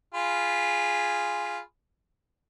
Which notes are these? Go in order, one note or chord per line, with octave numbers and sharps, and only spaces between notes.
F4 G#4 B5